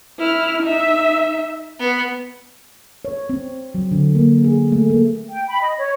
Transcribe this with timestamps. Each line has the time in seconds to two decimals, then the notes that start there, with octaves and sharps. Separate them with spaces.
0.19 E4 F6
0.62 D#4 E5
1.80 B3
3.05 C#5
3.30 C4
3.75 F#3
3.91 D3
4.15 A#3
4.44 G#4
4.72 A3
4.90 A#3
5.31 G5
5.48 B5
5.61 D#5
5.78 C#5